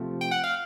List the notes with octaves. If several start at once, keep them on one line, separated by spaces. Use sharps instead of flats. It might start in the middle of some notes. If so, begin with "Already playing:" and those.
Already playing: C3 F3 A3
G5
F#5
F5